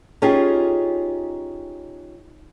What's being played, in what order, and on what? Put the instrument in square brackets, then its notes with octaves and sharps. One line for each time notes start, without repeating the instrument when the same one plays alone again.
[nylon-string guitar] C#4 D#4 F4 G4 G#4